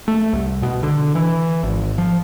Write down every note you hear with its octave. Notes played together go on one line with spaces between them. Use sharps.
A3
C2
B2
D3
E3
G#1
F3